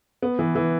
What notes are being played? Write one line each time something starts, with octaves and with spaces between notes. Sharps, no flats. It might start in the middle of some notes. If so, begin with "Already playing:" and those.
B3
E3
E3